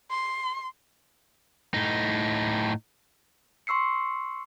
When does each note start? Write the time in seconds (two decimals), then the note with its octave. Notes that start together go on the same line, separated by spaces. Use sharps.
0.10 C6
1.74 A2 D#4
3.67 C6 C#6 E6 C7 C#7